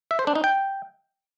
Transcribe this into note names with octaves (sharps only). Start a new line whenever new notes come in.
E5
C5
D4
D#4
G5